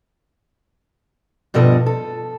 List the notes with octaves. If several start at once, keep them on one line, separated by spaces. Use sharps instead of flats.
G2 B2 F3 A4 D#5
A4